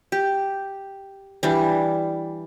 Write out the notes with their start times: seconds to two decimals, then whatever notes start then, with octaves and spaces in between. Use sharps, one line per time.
0.12 G4
1.43 E3 G3 D4